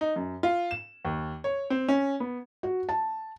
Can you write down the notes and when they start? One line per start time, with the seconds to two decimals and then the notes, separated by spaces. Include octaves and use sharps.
0.01 D#4
0.16 F#2
0.43 F4
0.71 E7
1.05 D#2
1.44 C#5
1.70 C4
1.88 C#4
2.20 B3
2.63 F#4
2.89 A5